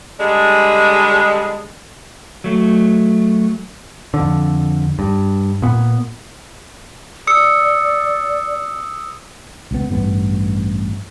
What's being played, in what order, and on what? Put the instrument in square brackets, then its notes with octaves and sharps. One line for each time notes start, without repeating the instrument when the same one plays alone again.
[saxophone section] D3 G3 G#3
[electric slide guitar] F#3 A3
[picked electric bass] F2 D3
G2
A#2 B3
[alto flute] D5 [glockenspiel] D#6 E6 C#7
[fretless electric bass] C#2 B3
A1 G2 B3